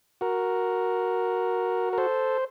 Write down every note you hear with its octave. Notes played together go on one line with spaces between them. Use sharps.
F#4 A#4
A#4
A4 C5